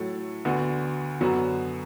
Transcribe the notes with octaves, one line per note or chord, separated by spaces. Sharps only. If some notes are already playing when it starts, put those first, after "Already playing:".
Already playing: A2 F#3 A3
D2 D3 B3 F#4
F#2 D3 F#3 B3 F#4